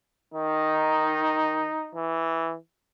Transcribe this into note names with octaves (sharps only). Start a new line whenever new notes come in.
D#3 D#4
E3